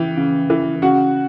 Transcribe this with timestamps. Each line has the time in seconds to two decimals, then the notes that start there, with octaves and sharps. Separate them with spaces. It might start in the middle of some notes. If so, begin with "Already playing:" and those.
Already playing: C#3 E3 G5
0.17 C#3
0.50 E3
0.82 C#3 F#4 F#5